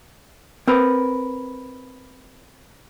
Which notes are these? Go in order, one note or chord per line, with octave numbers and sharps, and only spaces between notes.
C4 A#4 B4